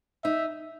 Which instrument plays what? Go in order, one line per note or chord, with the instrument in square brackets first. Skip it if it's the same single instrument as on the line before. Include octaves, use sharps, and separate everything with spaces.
[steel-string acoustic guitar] D#4 [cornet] E5